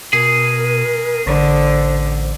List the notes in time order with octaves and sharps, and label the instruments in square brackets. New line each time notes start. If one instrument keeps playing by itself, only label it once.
[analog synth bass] B2 [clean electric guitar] G#4 [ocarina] A#4
[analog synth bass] A1 [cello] D3 [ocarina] C5